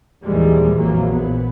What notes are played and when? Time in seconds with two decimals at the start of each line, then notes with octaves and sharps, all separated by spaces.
0.24 D#2 A#2 E3 F3 G3 G#3
0.75 A#1 F2 E3 F#3 A#3
1.10 A#2 B3